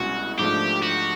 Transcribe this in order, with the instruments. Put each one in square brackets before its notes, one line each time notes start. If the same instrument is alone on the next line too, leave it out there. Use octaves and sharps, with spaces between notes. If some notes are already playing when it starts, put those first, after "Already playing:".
Already playing: [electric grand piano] C2 B2 G#3 C#4 E4 [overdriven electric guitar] F#4
[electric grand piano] G#2 F3 A3 D4 [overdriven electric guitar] G4
[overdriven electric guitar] F#4